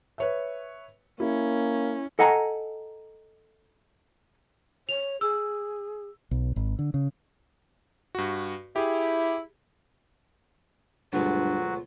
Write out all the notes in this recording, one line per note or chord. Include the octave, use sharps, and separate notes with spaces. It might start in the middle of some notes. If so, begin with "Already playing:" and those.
B4 C#5 E5
A#3 C#4 E4
A4 D#5 F#5 G#5 A#5
C#5 F7
G#4 E6
B1
G#1
D3
C#3
G2 F#4
E4 G4 G#4
D2 G2 B2 F#3 G#3 F4 F#4